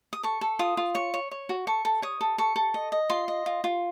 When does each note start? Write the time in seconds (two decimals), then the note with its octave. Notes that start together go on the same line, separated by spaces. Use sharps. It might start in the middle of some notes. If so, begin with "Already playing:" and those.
0.13 D#6
0.23 A4 C#6
0.41 A4
0.59 F4 D#6
0.77 F4
0.95 C#5 C#6
1.14 C#5
1.31 C#5
1.49 F#4
1.67 A4 C#6
1.85 A4
2.02 C#5 D#6
2.21 A4
2.38 A4 C#6
2.56 A4
2.74 D#5
2.92 D#5
3.10 F4 C6
3.28 D#5
3.46 F4
3.64 F4